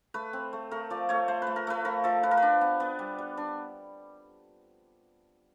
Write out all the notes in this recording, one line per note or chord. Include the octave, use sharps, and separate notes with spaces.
A3 B4
C4
A3
A3 A#4
F3 D5
A3 C#5
A3 C5
A3 B4
A#4
A3 B4
F3 A#4
F3 A4
F3 B4
A#4
B4
D4
B3
B3
G3
G3
D4